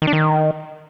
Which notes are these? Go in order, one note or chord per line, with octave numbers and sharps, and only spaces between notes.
D#3
D4
D#3